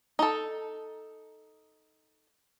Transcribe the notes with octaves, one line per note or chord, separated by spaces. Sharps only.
D#4 A4